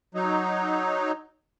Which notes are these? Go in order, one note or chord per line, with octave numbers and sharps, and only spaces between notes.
F#3 D#4